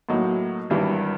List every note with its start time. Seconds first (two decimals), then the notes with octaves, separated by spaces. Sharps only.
0.09 A2 F#3 A#3 D#4
0.70 G#1 G2 E3 G3